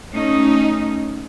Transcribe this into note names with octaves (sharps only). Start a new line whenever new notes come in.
A3 C#4 D#4